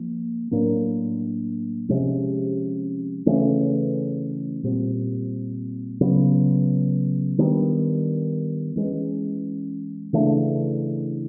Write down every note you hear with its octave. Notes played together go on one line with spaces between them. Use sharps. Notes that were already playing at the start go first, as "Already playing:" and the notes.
Already playing: F3 A#3
A2 F#3 A#3 D4
C3 F3 G#3 C#4
C#3 E3 A3 C#4
A#2 G3 C4
C#3 F#3 B3
D#3 G3 B3 D4
E3 G#3 C#4
C#3 E3 A3 D4